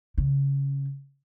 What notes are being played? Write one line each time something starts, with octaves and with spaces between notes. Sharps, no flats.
C#3